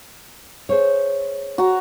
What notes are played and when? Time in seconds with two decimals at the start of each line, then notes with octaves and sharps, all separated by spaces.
0.69 G#4 C5 C#5
1.58 F#4 A#5